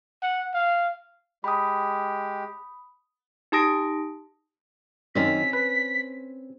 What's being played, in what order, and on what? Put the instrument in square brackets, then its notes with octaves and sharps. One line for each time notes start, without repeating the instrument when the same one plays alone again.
[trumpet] F#5
F5
[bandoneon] G#3 G4 [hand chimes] B5 D#6
[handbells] D#4 G4 A5 D#6 A#6 D7
[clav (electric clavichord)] F#2 D#3 [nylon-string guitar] C4 C#4 [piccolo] B6
[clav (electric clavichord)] B4